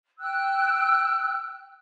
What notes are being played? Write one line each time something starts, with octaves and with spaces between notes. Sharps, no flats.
G5 E6 F#6